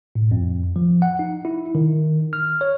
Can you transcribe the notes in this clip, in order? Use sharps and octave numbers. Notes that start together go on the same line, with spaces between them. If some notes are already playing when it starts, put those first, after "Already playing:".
A2
F2
F3
F#5
D#4
E4
D#3
F6
C#5